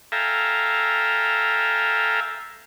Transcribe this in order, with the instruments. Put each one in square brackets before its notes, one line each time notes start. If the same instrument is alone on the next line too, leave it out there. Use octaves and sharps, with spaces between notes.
[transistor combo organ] A4 E5 F5 G5 G#5 A#5